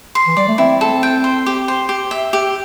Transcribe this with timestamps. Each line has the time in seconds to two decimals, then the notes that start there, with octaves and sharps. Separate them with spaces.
0.15 C6
0.27 E3
0.37 G3 D5
0.48 A3
0.58 C4 E4
0.81 A4
1.03 G5
1.24 C5
1.46 G4
1.68 C5
1.89 G4
2.11 E5
2.33 G4